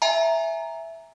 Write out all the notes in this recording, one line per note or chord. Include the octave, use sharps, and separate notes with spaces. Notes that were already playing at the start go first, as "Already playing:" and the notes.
E5 G#5 A#5